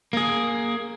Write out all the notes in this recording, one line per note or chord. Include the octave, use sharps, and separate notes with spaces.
A#3 G#4